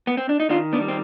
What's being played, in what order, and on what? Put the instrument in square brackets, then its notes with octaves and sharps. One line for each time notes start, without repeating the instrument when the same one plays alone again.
[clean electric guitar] B3
C4
D4
D#4
D#3 D4 F4
B3 D4
G3
C4